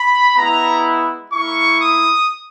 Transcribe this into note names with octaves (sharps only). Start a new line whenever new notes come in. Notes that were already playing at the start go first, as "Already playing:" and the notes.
Already playing: B5
G#3 B3 E4 A#5
A#3 E4 C#6
D#6